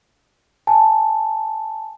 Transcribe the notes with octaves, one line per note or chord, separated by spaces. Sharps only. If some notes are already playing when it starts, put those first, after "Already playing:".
G#5 A5